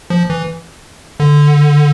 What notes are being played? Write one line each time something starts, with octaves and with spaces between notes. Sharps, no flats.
F3
E3
D3